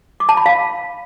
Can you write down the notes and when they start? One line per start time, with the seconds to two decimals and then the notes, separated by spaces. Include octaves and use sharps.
0.20 D6
0.29 A5
0.37 B5
0.46 F5